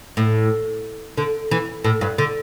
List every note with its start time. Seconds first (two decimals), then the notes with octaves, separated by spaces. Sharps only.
0.17 A2
1.17 D3
1.51 E3
1.84 A2
2.01 G2
2.18 D3